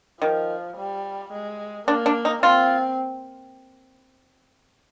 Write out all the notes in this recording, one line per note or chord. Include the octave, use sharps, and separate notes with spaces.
D#3 F3
G3
G#3
A#3 D4
D4
D#4
C4 F4